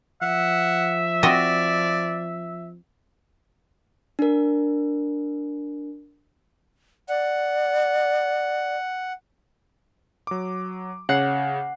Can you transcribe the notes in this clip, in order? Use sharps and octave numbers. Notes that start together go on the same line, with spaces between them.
F3 E5 F#5
C4 F#4 D5 D#5
D4 A#4
D5 F#5
F#3 D6
C#3 C#5 F#5 C7